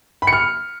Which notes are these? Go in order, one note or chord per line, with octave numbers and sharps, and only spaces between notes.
B5
C#7
F6